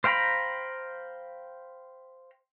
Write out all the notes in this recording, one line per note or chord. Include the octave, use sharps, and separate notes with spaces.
C5 F5 G5 A#5 B5